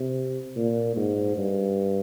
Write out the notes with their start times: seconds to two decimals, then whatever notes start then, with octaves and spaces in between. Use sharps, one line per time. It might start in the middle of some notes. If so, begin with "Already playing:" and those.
Already playing: C3
0.56 A#2
0.97 G#2
1.38 G2